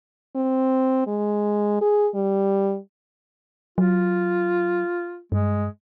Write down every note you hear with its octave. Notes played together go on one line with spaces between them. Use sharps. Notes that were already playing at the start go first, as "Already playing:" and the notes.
C4
G#3
G#4
G3
F#3 F4
G2 G#3